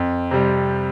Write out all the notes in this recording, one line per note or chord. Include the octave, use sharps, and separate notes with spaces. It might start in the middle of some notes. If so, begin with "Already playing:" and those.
Already playing: F2
C3 G3